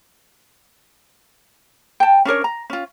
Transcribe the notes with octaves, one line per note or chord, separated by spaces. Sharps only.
G5 A5
C#4 D4 A#4 C#5
A#5
C#4 F4